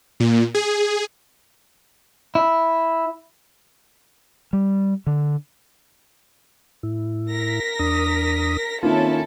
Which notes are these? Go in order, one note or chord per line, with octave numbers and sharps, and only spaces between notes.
A#2
G#4
E4
G3
D3
A2 E4
A#4 A#6 B6
E2 D4 D#6
D#3 A#3 C4 C#4 E4 F4 A4